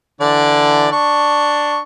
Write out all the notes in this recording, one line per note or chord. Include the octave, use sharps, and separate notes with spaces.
D3 E3 D5
D4 C#6